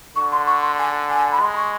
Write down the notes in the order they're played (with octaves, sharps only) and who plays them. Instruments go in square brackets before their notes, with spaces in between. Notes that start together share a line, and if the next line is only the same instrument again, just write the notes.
[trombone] D3 [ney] C#6
[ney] C6
C#6
C6
G#5
G#5
B5
[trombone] G#3 [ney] C6
[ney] C#6